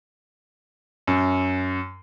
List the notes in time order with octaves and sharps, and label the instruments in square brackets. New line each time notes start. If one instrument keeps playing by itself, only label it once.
[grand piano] F#2